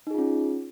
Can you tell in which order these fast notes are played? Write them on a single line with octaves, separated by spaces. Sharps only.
D#4 G#4 F4 C#4